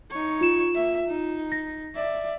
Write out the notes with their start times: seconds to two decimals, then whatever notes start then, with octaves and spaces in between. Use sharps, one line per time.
0.11 D#4 C#5
0.41 F4 E7
0.74 A#3 E5
1.06 D#4
1.52 A#6
1.95 D5 E5